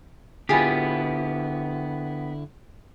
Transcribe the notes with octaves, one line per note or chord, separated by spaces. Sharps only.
D3 B3 E4 F4 G4 G#4